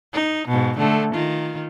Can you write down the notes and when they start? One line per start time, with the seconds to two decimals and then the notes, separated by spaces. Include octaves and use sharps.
0.13 D#4
0.48 G#2 B2
0.78 D3 A3
1.14 D#3 F4